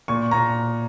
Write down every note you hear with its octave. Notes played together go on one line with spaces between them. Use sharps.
A#2 C#6
A#2 A#5